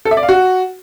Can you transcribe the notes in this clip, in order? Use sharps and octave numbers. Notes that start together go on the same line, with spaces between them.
A4
E5
D5
F5
F#4